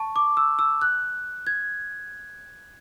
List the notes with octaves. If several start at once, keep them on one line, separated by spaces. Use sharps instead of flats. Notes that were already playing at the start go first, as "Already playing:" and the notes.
Already playing: A5 C#6
D6
E6
E6
F#6
G#6